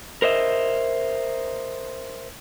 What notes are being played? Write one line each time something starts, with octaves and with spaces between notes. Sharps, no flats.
A#4 C5 D#5 E5